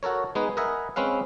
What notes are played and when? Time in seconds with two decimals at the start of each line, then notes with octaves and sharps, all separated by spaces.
0.03 F#4 A4 A#4 C#5
0.35 G#3 B3 D#4 G#4 B4
0.57 A#4 B4 D#5 E5 F#5 G#5
0.96 G#3 C4 C#4 B4 F5